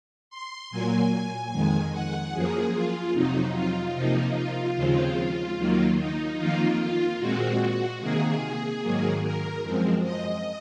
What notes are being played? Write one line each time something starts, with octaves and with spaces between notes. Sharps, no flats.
C6
A#2 F#3 A#3 G#5
F2 D#3 G#3
F#5
F#2 F3 A#3 G#4
F4
F2 C3 F#3 D#4
F4
C3 F3 A#3 D#4
F4
D#2 C#3 F3 G#3 C4
D#2 D#3 F#3 A#3
D#4
F2 D#3 A#3 F4
F4
A#2 G#3 C4 F#4
C3 D#3 A#3 G#4
G#2 D#3 F#3 A#3
A#4
F#2 F3 G#3 C4
D#5